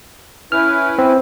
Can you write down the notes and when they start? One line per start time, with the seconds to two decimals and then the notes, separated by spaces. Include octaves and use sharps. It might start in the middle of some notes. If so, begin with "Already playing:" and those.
0.52 C#4 E4 B4 F6
0.98 C4